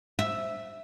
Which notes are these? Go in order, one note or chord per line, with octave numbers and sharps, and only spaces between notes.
E5